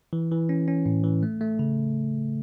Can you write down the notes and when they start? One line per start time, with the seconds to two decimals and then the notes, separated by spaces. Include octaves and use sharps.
0.13 E3
0.31 E3
0.49 C#4
0.68 C#4
0.86 A2
1.04 E3
1.23 A3
1.41 A3
1.59 C#3